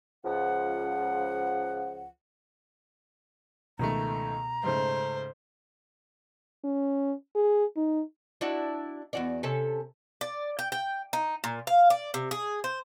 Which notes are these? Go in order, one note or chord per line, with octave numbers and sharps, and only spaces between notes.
C#2 F3 F#5
C#2 B2 D#3 A3 A#5
G#2 C#3 A3 C5
C#4
G#4
D#4
D4 E4 F#4
E2 F#4 D5
C3 C#4 A4
D5
G5
G5
D#4
A#2
F5
D5
C3
G#4
C5